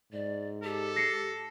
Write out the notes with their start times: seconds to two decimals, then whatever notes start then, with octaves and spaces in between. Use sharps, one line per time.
0.12 G#2 D5
0.64 G4 A4
0.96 G4 A#6 C7 C#7